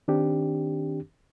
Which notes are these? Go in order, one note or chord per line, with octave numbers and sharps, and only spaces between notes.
D#3 C4 D4 G4